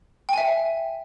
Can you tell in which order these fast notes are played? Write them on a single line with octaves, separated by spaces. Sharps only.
G5 G#5 E5